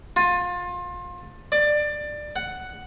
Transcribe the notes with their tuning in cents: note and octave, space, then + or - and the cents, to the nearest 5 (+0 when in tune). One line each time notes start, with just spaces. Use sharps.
F4 +25
D5 +20
F#5 +5